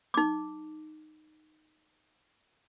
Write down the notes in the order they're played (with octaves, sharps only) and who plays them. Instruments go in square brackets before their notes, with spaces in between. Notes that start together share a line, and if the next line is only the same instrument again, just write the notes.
[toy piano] D#4 D6